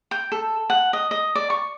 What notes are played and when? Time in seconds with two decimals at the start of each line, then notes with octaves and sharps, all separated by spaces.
0.11 G5
0.32 A4
0.70 F#5
0.93 D#5
1.11 D#5
1.35 D5
1.50 C#6